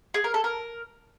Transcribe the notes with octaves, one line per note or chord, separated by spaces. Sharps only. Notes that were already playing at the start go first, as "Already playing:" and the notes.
G#4
A#4
A4
A#4